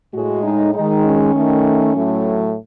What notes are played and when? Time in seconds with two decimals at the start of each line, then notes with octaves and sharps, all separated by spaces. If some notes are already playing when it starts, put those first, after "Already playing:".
0.14 A2 G#3 F#4
0.43 D#4
0.74 D#3 G#3 D#4
1.05 C#4
1.35 D#3 A3
1.95 A2 F#3 A3